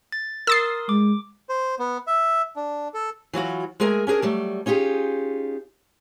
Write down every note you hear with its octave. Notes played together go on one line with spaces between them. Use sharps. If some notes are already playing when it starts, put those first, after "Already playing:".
A6
A#4 C6 D#6 E6 A6 C7
G#3 D6
C5
B3
E5
D4
A4
E3 F#3 F4 F#4
G#3 A3 G#4 A#4 G#5
C#4 D4 G#4 A#4
F#3 G3 A3
C#4 D#4 F4 G4 G#4